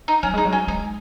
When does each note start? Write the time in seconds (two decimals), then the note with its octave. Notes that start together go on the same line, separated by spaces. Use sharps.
0.08 D#4
0.23 F#3 C#4
0.34 G#3 D#4
0.45 F#3
0.53 C#4
0.67 G#3 D#4